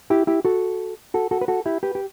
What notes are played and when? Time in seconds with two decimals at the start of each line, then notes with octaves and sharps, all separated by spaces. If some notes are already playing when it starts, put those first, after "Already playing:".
0.10 E4 G4
0.27 E4 G4
0.45 F#4 A4
1.14 F#4 A4
1.31 F#4 A4
1.41 B4
1.48 F#4 A4
1.66 E4 G4
1.83 G4 B4
1.95 G4